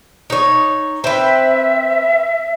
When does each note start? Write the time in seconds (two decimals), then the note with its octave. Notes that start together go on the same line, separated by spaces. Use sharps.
0.30 D#4 C#5
1.04 C4 B4 E5